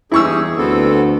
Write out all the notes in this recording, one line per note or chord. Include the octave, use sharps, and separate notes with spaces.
E2 D#4 E4 G4 G#4 C#6 E6
D2 B3 C4 A4